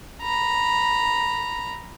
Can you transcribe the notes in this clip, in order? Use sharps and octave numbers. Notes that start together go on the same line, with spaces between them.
A#5 B5